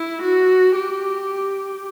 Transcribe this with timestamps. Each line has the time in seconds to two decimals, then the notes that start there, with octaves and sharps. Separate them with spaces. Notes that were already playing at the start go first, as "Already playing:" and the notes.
Already playing: E4
0.22 F#4
0.75 G4